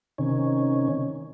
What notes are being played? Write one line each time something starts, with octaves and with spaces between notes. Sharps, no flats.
C3 D#3 C#4